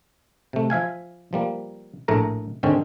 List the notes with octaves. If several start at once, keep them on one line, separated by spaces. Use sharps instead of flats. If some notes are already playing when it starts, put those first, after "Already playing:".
C3 A3
F3 E5 F5 G#5
F3 G3 A#3
A#1 A2 A3 A#4 A#5
G#2 D3 D#3 C4 C#4